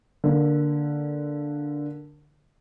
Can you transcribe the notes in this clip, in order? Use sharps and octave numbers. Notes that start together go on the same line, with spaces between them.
D3 A#3